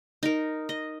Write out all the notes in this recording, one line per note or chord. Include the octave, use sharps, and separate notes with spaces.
D#4 A#4
D#5